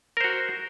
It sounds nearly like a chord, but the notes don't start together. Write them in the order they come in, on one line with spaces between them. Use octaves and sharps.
A#4 C5 F#4